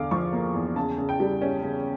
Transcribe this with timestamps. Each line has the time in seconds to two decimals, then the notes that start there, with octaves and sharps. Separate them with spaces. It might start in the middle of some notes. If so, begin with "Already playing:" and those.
Already playing: E2 D3 F5 D6
0.11 F3 C#6
0.33 A#3
0.54 E2
0.76 C#3 A5
0.98 C#3
1.09 G5
1.20 G3
1.41 C#4
1.62 C#3